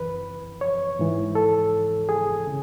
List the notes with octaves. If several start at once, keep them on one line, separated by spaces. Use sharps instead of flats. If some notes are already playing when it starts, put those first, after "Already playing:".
Already playing: F#2 E3 B4
C#5
G#2 E3
A4
G#4
C#3